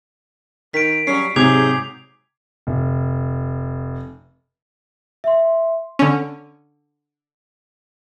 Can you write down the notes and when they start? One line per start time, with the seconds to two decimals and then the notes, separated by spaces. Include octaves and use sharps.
0.74 D#3 B6 D7
1.07 F#3 G3 C#4 C7
1.36 G#2 C3 F#3 G#4 D6 G6 G#6 F7
2.67 F1
5.24 E5 C6
5.99 D3 C#4